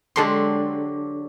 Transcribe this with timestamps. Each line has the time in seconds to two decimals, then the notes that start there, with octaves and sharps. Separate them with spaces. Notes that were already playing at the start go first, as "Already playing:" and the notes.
0.16 D3 F#3 G#3 G4 A4 C6